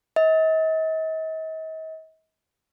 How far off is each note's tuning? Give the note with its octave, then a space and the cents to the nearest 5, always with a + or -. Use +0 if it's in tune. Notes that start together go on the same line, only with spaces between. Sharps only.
D#5 +45